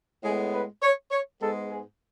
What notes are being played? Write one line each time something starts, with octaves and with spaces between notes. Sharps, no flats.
A2 G#3 B3 G#4
B4
C#5
C#5
G#2 G#3 B3 A4
G#4